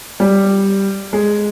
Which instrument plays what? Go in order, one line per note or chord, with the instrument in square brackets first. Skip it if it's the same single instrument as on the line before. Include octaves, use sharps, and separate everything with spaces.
[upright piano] G3
G#3